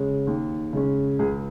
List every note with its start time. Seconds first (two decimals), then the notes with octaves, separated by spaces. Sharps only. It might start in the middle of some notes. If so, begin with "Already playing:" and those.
Already playing: C#3 G#3 C#4
0.27 D#2
0.73 C#3 G#3 C#4
1.19 C#2 G#4